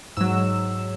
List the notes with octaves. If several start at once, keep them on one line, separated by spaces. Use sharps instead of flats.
G#2 F#3 E6